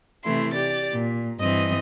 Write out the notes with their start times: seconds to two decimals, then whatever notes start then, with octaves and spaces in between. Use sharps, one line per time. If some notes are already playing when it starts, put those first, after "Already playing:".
0.24 C3 E3 A3 E4 C6
0.53 G4 D5 A6
0.92 A#2
1.40 G2 E3 C4 D#5 D#6